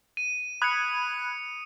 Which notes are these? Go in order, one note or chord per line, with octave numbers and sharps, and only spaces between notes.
D#7
B5 D#6 F#6 G#6 C#7